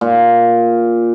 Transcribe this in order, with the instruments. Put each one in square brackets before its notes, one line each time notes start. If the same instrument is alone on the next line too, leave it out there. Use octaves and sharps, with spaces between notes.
[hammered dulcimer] A#2